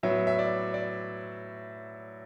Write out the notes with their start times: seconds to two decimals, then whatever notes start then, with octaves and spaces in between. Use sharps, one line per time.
0.03 A2 F#3 B3 E5
0.27 E5
0.39 D5
0.74 D5